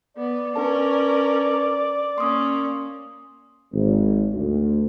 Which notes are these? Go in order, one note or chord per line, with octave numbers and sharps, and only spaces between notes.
B3 D5
C#4 D4 A#4 B4 A5
A#3 C#4 C6 D#6
G#1
D2